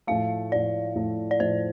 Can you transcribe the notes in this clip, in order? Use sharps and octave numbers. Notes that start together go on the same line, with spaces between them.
A2 F3 A3 F5
A2 F3 A3 D5
A2 F3 A3
D5
A2 F3 A3 C5